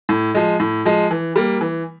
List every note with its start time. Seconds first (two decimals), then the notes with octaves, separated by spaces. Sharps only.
0.09 A2
0.35 F3 G#3
0.60 A2
0.85 F3 G#3
1.11 E3
1.36 G3 A#3
1.61 E3